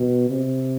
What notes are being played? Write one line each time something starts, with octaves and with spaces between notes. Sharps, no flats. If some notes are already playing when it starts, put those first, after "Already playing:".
Already playing: B2
C3